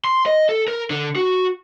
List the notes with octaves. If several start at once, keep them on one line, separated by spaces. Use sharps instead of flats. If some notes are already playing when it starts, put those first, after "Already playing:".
C6
D#5
A4
A#4
D3
F#4